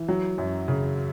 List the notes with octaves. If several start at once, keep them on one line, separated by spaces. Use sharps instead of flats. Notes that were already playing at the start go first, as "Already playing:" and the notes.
Already playing: E3
F#3
F#2
C#3